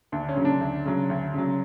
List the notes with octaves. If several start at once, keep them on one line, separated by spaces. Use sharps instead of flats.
D2 D4
C#4
C#3 F#3
D4
D2
C#3 F#3
D2
C#3 F#3